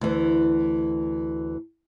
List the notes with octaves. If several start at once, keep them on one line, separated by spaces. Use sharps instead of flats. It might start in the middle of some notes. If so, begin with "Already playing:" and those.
D2 E3